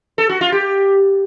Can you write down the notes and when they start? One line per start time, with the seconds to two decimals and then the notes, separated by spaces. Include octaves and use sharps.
0.18 A4
0.29 F#4
0.41 F4
0.52 G4